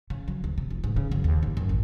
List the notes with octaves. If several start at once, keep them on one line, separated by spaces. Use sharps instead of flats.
C#3
F#3
D2
C3
F1
G#2
C#3
F#2
D#2
G#1
F#2
A1